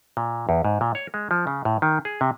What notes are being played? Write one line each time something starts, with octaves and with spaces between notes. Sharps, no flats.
A#2
E2
G#2
A#2
C#5
G#3
F3
C#3
A2
D#3
G#4
C3